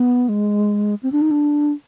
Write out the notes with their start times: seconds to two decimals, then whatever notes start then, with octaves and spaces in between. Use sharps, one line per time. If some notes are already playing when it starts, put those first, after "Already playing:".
Already playing: B3
0.29 G#3
1.03 C4
1.12 D4
1.22 D#4
1.31 D4